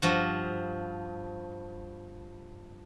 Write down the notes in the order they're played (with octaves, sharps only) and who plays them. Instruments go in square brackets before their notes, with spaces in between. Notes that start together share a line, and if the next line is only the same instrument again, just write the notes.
[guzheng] G2 F3 F#4